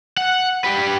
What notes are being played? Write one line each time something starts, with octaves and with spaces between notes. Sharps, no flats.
F#5
G4 B4